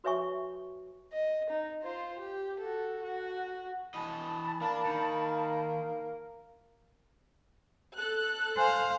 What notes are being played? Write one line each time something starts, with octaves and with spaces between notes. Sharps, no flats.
F#4 B4 C#5 E5 G#5 C#6
D#5
D#4
F4 C5
G4
F#4 A4
F#4
E3 D#5 A5 B5
A#3 D4
D#3
A4 F#6
C5 F5 G#5